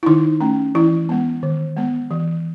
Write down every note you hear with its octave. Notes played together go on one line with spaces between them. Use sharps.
E4
D#3 D#4
A3 C#4
E3 E4
G#3 B3
D#3
G#3 B3
E3